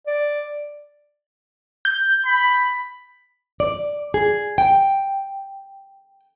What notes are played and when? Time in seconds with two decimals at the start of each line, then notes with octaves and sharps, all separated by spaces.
0.07 D5
1.85 G6
2.25 B5
3.60 D5
4.14 G#4
4.58 G5